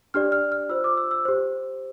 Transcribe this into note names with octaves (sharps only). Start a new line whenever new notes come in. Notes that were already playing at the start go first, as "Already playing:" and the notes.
D4 G4 D5 F6
F6
F6
F4 C5 E6
D6
E6
E6
G4 C5